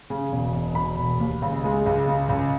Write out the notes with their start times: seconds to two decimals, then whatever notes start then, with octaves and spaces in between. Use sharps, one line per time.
0.10 C#3
0.32 E1
0.54 E1
0.75 E1 B5
0.98 E1
1.19 D#2
1.42 C#2
1.64 G#3
1.86 C#2
2.08 C#3
2.29 C#2